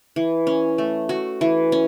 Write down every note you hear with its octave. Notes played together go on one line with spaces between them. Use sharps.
E3
C#4
A3
F#4
E3
C#4